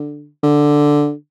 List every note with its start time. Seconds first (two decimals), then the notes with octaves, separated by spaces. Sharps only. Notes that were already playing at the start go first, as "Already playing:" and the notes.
Already playing: D3
0.43 D3